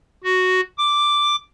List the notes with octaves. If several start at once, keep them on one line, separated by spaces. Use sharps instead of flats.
F#4
D6